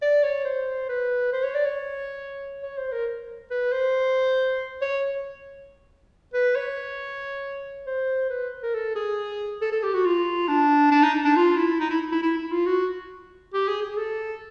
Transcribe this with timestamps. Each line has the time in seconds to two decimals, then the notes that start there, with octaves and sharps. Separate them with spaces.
0.02 D5
0.23 C#5
0.45 C5
0.89 B4
1.32 C5
1.44 C#5
1.54 D5
1.65 C#5
2.63 C#5
2.78 C5
2.92 A#4
3.51 B4
3.72 C5
4.81 C#5
6.33 B4
6.55 C#5
7.86 C5
8.30 B4
8.63 A#4
8.74 A4
8.95 G#4
9.61 A4
9.72 A4
9.83 G4
9.94 F#4
10.05 F4
10.48 D4
10.91 D4
11.03 D#4
11.25 D4
11.36 F4
11.57 E4
11.80 D#4
11.90 E4
12.12 E4
12.22 E4
12.38 E4
12.52 F4
12.66 F#4
13.53 G4
13.68 G#4
13.82 G#4
13.97 A4